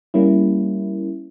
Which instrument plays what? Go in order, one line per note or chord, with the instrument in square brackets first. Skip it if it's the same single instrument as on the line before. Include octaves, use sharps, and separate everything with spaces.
[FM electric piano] G3 A#3 C#4 E4